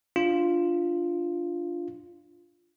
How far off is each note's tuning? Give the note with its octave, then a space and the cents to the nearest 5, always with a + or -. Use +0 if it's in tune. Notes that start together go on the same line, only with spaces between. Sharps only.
D4 +0 F4 -5